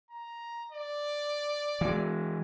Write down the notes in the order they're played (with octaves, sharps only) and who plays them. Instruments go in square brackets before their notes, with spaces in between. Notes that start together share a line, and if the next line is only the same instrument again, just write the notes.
[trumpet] A#5
D5
[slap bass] E3 G#3